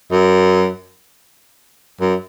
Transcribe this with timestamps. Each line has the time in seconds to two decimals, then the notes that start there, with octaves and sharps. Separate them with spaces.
0.12 F#2
2.01 F#2